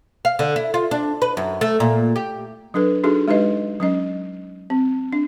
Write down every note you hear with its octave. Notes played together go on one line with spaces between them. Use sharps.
F5
D3
E4
F4
D4
B4
F#2
A3
A#2
G4
F#3 D4 A4 B4
D4 D#4 F#4 G#4 A4
G#3 D#4 G4 B4 D#5
F#3 C#4 D#5
C4
D4